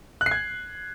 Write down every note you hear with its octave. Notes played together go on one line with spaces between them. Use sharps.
F#6
C7
G#6